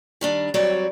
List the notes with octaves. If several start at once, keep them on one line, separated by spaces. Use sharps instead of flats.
D#3 G3 D4
F#3 G3 C4 F#4 C#5 D5